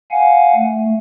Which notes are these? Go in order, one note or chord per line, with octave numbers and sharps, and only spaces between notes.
F5 F#5 G#5
A3